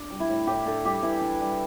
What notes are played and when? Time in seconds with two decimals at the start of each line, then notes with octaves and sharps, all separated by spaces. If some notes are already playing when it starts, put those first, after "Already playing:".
Already playing: D4
0.11 G3
0.20 E4
0.30 A2
0.47 A2 G4
0.66 D4 A4
0.85 G3 G4
1.03 E3 E4
1.21 D4
1.41 G3